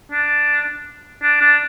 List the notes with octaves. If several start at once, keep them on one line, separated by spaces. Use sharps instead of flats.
D4
D4
D4